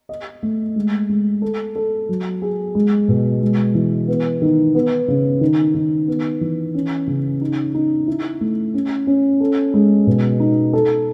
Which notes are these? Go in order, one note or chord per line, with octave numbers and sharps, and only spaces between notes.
D#5
A3
G#3
G#3
A4
A4
F#3
G#4
G#3
B2
G#3
E3
B3
D#3
B3
C#3
D#3
D#3
B3
E3
C#4
C#3
D#4
D#4
E4
A3
C#4
C#4
A4
G#3
B2
D#4
A4